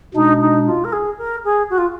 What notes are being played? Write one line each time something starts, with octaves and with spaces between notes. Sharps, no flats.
B2 G#3 D4 D#4
D#4
F4
A#4
G#4
A#4
G#4
F#4
F4